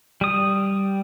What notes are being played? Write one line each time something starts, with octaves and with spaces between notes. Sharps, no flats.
G3 D#6